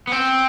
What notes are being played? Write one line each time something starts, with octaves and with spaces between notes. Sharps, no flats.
B3
C4